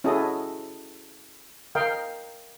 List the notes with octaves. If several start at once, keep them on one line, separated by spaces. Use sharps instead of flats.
C#4 E4 F#4 G#4 A4 D#5
A#4 D#5 F5 G5